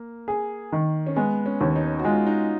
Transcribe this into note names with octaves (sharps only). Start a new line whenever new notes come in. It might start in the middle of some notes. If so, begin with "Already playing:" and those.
Already playing: A#3
G#4
D#3
C#4
G#3 B3
C#4
D#2
D#4
F#4
G#3 F4
D#4